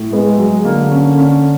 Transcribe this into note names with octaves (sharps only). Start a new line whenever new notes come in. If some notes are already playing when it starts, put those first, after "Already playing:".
Already playing: A2
G#3 B3
F#3
D3 A#3
C#4
C#4